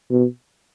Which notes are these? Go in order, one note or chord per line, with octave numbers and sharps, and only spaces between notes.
B2